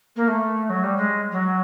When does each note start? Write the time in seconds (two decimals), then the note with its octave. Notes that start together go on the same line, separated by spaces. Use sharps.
0.16 A#3
0.27 A3
0.69 F#3
0.83 G3
0.97 G#3
1.31 F#3